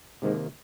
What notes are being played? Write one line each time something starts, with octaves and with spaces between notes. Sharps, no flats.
G#2 C3 D#3 A#3